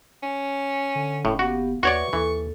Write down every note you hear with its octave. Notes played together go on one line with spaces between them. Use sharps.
C#4
D3
F#1 A2 C#4 D6
B3 F#4 G4 F5
D#2 F#4 B4 C#5 D5 E5 C#6
D#2 E3 A4